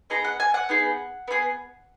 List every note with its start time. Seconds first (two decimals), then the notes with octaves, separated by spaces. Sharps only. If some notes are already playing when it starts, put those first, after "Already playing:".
0.10 B3 D#4 G#4 A#5
0.25 F#5
0.40 G#5
0.54 F#5
0.69 B3 D#4 G#4
1.28 B3 D#4 G#4